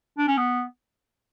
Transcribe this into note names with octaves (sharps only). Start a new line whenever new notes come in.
D4
C#4
B3